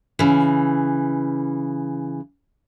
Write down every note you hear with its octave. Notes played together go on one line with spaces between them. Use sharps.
C#3 E3